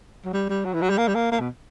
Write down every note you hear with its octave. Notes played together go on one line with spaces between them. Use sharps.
F#3
G3
G3
F#3
E3
F#3
G3
A#3
G3
A#3
A#3
B2